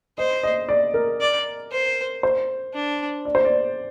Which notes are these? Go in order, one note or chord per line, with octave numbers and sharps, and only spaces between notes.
C5 D#5
D#5
D5
A#4
D5
C5
C5
D4
D5
C5
D5